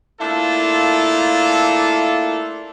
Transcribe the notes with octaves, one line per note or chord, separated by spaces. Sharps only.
A3 A#3 D4 E4 F4 A4